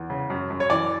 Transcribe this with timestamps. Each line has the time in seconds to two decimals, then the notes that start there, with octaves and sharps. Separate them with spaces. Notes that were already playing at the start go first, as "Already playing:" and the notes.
Already playing: E2
0.10 C#3
0.30 F#2
0.50 F#2
0.60 C#5
0.70 E3 D5